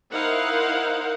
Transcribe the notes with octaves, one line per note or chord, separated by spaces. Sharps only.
D#4 E4 A#4 C5 F5 F#5